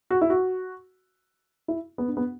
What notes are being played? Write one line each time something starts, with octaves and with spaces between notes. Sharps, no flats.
F#4
E4
F#4
E4
B3
D4
B3